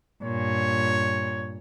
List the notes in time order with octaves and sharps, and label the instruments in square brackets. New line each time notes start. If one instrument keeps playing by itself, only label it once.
[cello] G2 A#2 [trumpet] C#5